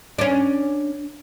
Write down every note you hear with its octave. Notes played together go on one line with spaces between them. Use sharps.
C#4 D4